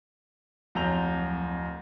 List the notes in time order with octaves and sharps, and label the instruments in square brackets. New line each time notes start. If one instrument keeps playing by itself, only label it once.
[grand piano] D1 F2 F#3 A#5 G6 F7